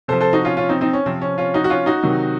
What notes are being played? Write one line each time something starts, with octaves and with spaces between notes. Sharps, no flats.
C3 F3 A4 C5
A4 C5
D#4 F#4
C#4 F4
C#4 F4
C4 D#4
C4 D#4
C#4
C3 F3 C4
C#4
C#4 F4
D#4 F#4
F#4
C#4 F4
D#4 F#4
C3 D#3 F#3